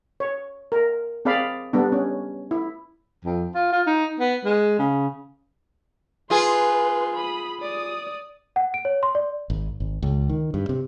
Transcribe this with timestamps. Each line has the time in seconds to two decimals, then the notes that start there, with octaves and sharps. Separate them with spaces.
0.20 C#5
0.72 A#4
1.25 C4 G#4 D5 F5 B5
1.73 G3 B3 D4
1.92 C#4
2.51 E4
3.25 F2
3.54 F4
3.73 F4
3.87 D#4
4.20 B3
4.45 G#3
4.79 C#3
6.30 F4 G#4 B4 C6
7.16 B5 D#6
7.61 D5 D#6
8.56 F#5
8.74 D7
8.85 C#5
9.03 C6
9.15 D5
9.50 G#1
9.80 G#1
10.02 C#2
10.30 D#3
10.54 G2
10.69 C3